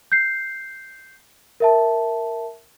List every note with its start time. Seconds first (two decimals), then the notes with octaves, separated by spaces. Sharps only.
0.12 G6 C7
1.60 A#4 E5 A5